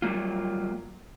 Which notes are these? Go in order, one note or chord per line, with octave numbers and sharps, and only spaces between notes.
F#3 G3 A#3 F4